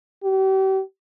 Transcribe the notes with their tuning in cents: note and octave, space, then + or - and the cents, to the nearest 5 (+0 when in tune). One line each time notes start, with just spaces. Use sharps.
G4 -40